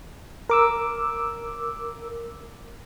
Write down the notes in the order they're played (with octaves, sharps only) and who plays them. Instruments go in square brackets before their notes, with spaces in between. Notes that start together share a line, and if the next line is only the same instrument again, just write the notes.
[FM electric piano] A#4 D6 E6